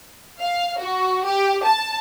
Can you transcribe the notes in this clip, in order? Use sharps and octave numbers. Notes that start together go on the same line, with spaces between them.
F5
F#4
G4
A5